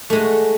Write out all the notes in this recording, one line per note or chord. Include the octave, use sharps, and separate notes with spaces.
G#3 A3 F#4